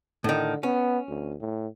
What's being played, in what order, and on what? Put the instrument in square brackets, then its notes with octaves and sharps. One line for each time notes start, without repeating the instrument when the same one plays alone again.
[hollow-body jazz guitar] A2 D#3 [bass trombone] D3
[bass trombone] B3 [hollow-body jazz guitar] C#4
[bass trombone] D2
A2